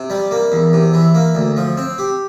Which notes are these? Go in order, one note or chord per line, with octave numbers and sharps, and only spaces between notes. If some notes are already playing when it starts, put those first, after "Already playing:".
Already playing: C3
G3
A#3
E2
C3
E3
A#3
D2
F3
C4
G4